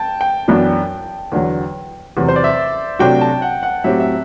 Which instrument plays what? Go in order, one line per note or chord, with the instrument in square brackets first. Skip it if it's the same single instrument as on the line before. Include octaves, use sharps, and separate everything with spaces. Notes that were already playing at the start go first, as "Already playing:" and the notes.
Already playing: [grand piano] G5 A5
G5
[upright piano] F#2 E3 B3 D4 F#4
E2 D3 F#3
E2 C3 F#3
[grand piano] C5
D5
E5
[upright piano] C3 F#3 A3 D4 F#4 [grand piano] G5
[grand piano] A5
F#5
F#5
[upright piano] A2 F#3 C4 G4 [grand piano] E5
[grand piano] E5